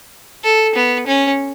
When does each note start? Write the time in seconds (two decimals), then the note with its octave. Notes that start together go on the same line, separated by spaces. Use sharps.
0.44 A4
0.75 B3
1.07 C#4